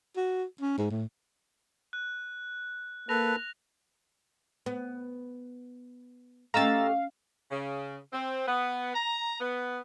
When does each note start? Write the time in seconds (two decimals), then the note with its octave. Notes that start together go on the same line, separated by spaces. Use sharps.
0.17 F#4
0.61 C#4
0.78 G#2
0.90 A2
1.93 F#6
3.09 A#3 A4 B4 A#6 F7
4.66 B3
6.54 A3 C#4 G4 D#5 F5 A#5 E6 A6
7.50 C#3
8.12 C4
8.47 B3
8.94 A#5
9.40 B3